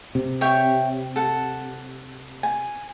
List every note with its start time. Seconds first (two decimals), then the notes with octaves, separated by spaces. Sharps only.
0.15 C3
0.41 C#5 E5 G5
1.16 A4 F#5
2.43 G#5